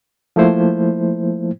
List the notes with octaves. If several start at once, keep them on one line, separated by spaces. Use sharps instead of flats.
F3 A3 A#3 E4 C5